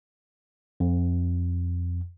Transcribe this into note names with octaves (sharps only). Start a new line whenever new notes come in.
F2